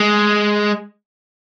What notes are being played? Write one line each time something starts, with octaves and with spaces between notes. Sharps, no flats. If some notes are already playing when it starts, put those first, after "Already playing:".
Already playing: G#3